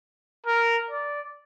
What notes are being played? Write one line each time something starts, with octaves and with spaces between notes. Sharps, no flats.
A#4
D5